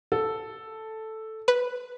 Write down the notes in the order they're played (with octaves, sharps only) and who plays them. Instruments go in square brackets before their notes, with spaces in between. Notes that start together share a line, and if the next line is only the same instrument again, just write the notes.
[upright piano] A4
[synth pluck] B4